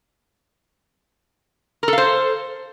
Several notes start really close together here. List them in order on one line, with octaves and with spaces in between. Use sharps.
A#4 A4 F5 C5